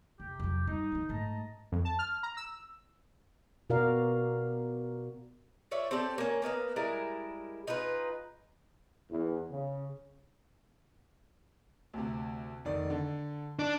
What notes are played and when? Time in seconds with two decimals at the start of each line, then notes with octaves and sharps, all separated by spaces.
0.20 F2 C3 G4
0.39 F2 F#3
0.67 G2 D#4
0.92 D#3 F3
1.09 G#2 A3 D#5 A5 A#5
1.72 F2
1.85 A5
1.99 F6
2.23 A#5
2.37 E6
3.70 B2 F#4 A#4 D5 F5
5.71 F4 C#5 D5 E5
5.91 C4 G4 A4 D5
6.18 A#3 C#4
6.42 A#3 B3 D#5 F5
6.76 G3 G#3 E4 A#4
7.67 D#4 F4 G#4 B4
9.11 E2
9.51 C#3
11.94 D2 C3
12.65 F1 D#3 D5
12.90 D3
13.59 D4